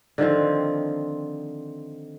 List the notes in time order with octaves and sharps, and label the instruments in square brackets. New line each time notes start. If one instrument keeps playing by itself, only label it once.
[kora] D3 D#3 F3 C4